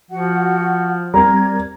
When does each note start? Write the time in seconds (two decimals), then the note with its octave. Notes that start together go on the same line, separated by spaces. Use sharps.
0.11 F3 F#4 F#5
1.14 G3 C4 A#4 D5 A#5 G#6